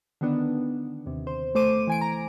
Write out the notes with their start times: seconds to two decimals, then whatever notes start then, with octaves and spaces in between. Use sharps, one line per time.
0.21 D3 D#3 B3 D4
1.06 D#2 C3
1.27 C5
1.55 A3 C5 D6 D#7
1.87 E3 G#5 D7
2.01 A#5